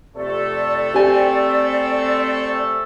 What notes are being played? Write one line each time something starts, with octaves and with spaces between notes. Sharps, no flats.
F2 C3 A3 A4 D5
C4 G4 G#5